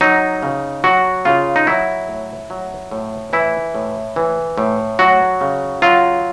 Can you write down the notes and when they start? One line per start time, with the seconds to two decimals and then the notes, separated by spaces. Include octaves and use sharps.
0.01 F#3 D#4
0.43 C#3
0.84 F#3 F#4
1.25 C#3 F4
1.56 D#4
1.67 F#3 E4
2.08 A2
2.50 F#3
2.91 A2
3.33 E3 E4
3.75 A2
4.16 E3
4.58 A2
4.99 F#3 F#4
5.41 C#3
5.82 F#3 F4